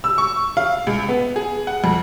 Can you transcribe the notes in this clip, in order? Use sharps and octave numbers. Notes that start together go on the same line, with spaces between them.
E6
C#6
F5
C#2
B3
G#4
F#5
F2